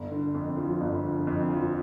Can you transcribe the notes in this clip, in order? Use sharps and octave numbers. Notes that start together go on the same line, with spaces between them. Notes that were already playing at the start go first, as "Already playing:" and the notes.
Already playing: G1
D3
F2
F3
G1
D3
F2
F3